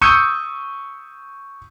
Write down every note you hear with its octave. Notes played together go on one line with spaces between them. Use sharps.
C#6 D#6 E6 G6 C#7 D#7